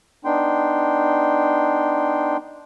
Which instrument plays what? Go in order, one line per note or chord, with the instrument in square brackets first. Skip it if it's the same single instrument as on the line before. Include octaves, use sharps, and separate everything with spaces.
[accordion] B3 D4 D#4 G5 C6